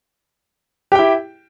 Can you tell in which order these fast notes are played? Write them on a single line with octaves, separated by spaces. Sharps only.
G4 G5 E4